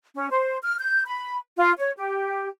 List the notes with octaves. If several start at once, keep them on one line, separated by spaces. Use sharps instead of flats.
C#4
C5
F6
G6
B5
F4
C#5
G4